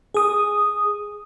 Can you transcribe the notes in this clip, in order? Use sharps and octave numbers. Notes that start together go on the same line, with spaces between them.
G#4 D#6